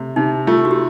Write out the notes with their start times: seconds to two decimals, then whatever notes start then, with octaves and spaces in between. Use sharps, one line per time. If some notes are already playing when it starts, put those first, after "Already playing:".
Already playing: C3 A3
0.16 C3 D#4
0.47 A3 F4
0.65 F#4
0.71 G4